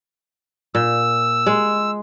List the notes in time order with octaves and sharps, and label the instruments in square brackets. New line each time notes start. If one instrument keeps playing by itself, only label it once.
[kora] A#2 [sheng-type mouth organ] E6
[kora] G#3